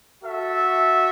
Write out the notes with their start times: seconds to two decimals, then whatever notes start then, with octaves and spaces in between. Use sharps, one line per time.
0.23 F#4 A4 E5